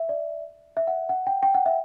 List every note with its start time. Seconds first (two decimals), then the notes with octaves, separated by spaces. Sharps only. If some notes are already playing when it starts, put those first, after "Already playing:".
Already playing: E5
0.09 D5
0.77 E5
0.87 F#5
1.09 F#5
1.27 G5
1.43 G5
1.54 F#5
1.66 E5